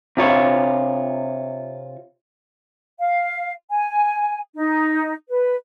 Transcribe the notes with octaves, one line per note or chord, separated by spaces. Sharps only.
C3 F4 C#5
F5
G#5
D#4
B4